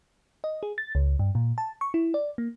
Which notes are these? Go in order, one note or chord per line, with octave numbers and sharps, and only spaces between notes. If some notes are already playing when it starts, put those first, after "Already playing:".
D#5
G#4
A6
C#2
G2
A#2
A5
C#6
E4
D5
A#3